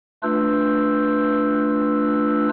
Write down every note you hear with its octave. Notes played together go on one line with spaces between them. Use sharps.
A3 D4 F4 B4 E6 G6